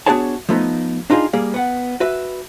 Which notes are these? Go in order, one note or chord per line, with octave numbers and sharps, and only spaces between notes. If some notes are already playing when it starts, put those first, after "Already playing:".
B3 D4 F#4 G#4 C#5 A5
F3 A3 B3 D#4
D4 D#4 F4 G4 G#4
G3 A#3 G#4
B3 F#5
F#4 B4 E5